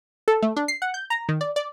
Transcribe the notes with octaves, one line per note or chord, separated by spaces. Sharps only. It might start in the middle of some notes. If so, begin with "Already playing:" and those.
A4
A3
D4
C7
F#5
G6
A#5
D#3
D5
D5